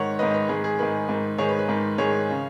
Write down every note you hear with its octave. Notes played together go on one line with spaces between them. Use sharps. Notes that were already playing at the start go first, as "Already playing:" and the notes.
Already playing: G#2 D#3 C#5 F#5
G#2 D#3 B4 D#5
B4
G#2 D#3 G#4
G#4
G#2 D#3 B4
G#2 D#3
G#2 D#3 G#4 C#5
B4
B4
G#2 D#3
G#2 D#3 G#4 C#5
C#3